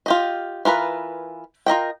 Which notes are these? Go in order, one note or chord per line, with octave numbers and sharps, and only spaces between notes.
F4 G4 D#5
E3 F4 A#4 B4
F4 A#4 D#5 G5